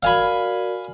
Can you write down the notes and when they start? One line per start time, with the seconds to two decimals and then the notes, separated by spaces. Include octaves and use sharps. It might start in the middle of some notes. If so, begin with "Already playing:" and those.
0.03 F#4 A#4 D5 F5 G#5 B5